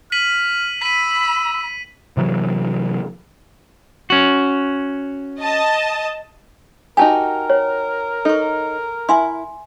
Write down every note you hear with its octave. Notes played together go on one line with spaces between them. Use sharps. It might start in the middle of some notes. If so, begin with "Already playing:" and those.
F6 B6 D#7 F#7
B5 E6 B6 D#7
C3 E3 F#3
C#4 F#4
D#5 A5
D#4 F#4 G4 A#4 G#5 A5
C#5
D#4 A4 C#6
E4 E5 G#5 C6